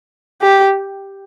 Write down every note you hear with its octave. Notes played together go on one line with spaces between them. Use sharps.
G4